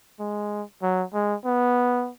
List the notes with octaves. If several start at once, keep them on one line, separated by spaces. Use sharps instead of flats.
G#3
F#3
G#3
B3